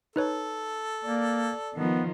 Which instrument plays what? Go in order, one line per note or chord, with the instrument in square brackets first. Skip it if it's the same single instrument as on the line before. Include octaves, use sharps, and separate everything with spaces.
[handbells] D#4 B4 C#5 [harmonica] A4
[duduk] A#3 [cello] D5
[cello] D#3 F3 [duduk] B3